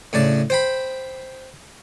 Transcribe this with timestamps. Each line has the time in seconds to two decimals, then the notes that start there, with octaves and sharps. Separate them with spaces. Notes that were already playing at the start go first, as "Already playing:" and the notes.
0.13 A2 C#3 D4 D5
0.50 C5 G5 B5